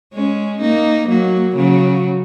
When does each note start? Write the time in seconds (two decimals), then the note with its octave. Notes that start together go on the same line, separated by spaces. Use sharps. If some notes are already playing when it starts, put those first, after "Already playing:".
0.14 G#3 C#4
0.61 A#3 D#4
1.09 F#3 A#3
1.56 C#3 F#3